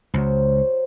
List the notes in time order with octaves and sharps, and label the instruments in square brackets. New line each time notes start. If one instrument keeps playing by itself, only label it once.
[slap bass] C#2 [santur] F#3 C5